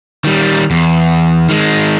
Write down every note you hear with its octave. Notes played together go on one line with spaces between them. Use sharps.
D#3 G3
E2
D#3 G#3